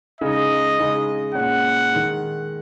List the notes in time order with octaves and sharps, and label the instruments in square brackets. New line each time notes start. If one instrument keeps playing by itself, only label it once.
[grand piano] C#3 G#3 D#4 [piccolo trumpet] D#5
[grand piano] C#3 G#3 D#4
[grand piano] A#2 G#3 C#4 [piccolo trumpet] F#5
[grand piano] D#3 G#3 D#4